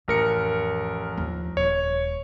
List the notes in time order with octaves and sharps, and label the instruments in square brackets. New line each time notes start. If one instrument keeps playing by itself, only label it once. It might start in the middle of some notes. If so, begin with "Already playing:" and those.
[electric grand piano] A1 A#4 C#7 [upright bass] F2
[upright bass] D#2 F3
[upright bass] D#1 [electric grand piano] C#5